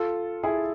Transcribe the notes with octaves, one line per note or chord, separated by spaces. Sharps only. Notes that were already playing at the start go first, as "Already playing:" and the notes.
Already playing: F4 A4
E4 G#4